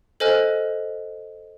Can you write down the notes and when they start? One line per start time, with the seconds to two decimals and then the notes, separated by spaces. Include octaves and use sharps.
0.20 A4 C5 D#5 G#5 F6 F#6